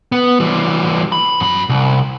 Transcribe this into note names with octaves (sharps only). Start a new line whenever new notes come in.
B3
E3 G3
B5
F#2 B5
C2